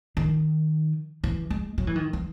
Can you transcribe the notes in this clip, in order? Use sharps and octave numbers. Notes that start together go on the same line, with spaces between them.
D#3
E3
G#3
F#3
E3
D#3
E3